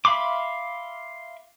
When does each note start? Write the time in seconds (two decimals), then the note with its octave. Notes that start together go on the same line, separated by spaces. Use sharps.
0.05 E5 F5 B5 C6 D6